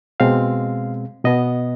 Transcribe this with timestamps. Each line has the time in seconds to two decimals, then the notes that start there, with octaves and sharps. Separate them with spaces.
0.20 B2 G#3 C4 F5
1.24 B2 B3 D#5